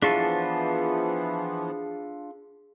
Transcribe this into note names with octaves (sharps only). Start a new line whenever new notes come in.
E3 F3 B3 D4 F4 G#4 A4